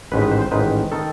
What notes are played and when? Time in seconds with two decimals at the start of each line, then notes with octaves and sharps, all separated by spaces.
0.12 A1 G#2 D#3 B4
0.22 B4
0.31 C5
0.42 C5
0.51 A1 G#2 D#3 B4
0.92 D#3 A4